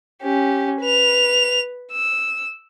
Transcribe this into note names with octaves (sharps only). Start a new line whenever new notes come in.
C#4 G4
B4 F7
E6